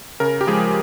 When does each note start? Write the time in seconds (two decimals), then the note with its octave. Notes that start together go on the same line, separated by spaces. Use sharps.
0.20 C#3 A#4
0.41 G4
0.47 F3 G#3 G#4